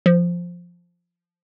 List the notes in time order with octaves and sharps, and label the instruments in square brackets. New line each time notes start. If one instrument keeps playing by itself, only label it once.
[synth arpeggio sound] F3